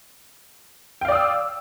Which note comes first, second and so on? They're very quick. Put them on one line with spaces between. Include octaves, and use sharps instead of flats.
G5 F5 D5 D#6 E6